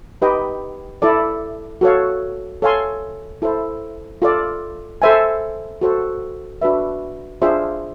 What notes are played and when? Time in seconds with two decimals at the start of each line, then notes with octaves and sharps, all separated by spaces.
0.22 D#4 G4 B4 D#5 G5
1.02 E4 A4 D5
1.81 F#4 A4 C#5 F5
2.62 A4 C#5 F5 G#5 C6
3.42 E4 A4 C5
4.22 F4 A4 D5
5.02 A4 C5 E5 G#5
5.81 F#4 A4 C5
6.62 D4 F#4 B4 E5
7.42 D4 F4 G#4 C5 E5